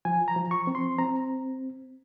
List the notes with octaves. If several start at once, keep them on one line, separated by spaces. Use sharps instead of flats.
F3 G#5
A#5
F3
C#6
C4
C6
C4 A#5